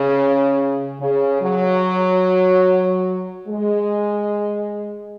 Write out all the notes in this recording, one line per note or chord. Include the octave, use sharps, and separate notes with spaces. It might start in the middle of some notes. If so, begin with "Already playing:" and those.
Already playing: C#3
C#3
F#3
G#3